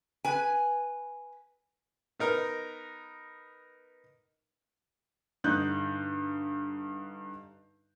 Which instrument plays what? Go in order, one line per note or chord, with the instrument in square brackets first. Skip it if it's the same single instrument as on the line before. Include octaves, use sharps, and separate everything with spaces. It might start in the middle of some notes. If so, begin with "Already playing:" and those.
[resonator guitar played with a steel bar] B4 G#5
[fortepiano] B3 D#4 A#4
[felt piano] G2 D3 D#4 F#6 G6